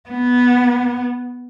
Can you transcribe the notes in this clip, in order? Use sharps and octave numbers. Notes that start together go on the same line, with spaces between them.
B3